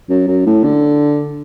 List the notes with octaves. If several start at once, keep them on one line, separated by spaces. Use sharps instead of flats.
F#2
F#2
A2
D3